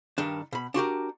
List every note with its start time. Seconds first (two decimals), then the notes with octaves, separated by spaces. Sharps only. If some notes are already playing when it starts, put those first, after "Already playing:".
0.18 G2 D#3 D4
0.53 B2 B5
0.74 D4 F#4 G4 A#4